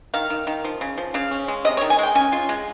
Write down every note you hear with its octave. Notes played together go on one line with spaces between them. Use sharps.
D#3 F5
D#3
D#3
F3
C#3
F3
C#3 F5
C#4
G#3
C3 D#5
C#5
D#3
G#5
G#3 G5
C#4 G#5
F4
G#3